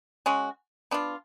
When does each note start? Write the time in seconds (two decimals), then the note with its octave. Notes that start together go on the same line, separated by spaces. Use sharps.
0.26 G#3 C#4 F#4
0.91 B3 D4 F4